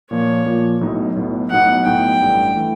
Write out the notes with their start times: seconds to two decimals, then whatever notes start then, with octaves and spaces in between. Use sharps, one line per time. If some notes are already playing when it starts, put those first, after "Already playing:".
0.11 A#2 F3 A#3 C#5
0.46 A#2 F3 A#3
0.81 B1 A2 F#3 B3 D#4
1.15 B1 A2 F#3 B3 D#4
1.50 B1 A2 F#3 B3 D#4 F#5
1.86 B1 A2 F#3 B3 D#4 G5
2.20 A1 G2 E3 A3
2.56 E3 A3